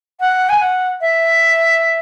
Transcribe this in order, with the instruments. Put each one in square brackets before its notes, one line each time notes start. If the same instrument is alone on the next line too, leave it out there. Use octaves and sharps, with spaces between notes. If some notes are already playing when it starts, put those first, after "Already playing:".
[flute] F#5
G#5
F#5
E5